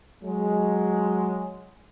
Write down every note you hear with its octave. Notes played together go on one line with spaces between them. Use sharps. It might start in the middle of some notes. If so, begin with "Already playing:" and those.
F#3 G#3